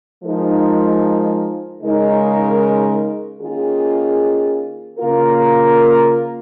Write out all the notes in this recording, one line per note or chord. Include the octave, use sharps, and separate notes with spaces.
F3 G#3 D#4 A#4
C#3 G#3 D#4 A#4
D#3 A#3 C#4 F4 G#4
C#3 A#3 F4 A#4